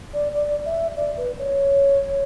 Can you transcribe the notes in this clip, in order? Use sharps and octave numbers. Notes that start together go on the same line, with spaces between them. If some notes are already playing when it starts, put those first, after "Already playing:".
D5
D5
E5
D5
B4
C#5